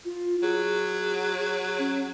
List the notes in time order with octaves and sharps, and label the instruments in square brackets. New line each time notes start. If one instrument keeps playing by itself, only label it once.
[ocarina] F4
[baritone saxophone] F#3 [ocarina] G#4
[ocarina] C#4